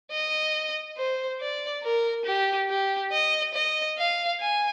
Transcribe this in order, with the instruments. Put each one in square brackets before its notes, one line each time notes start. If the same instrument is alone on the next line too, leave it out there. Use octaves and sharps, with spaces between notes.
[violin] D#5
C5
D5
A#4
G4
G4
D#5
D#5
F5
G#5